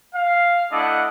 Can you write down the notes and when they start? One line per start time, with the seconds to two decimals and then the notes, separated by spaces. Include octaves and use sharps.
0.15 F5
0.71 A3 D4 E4 D#5 E5 F#5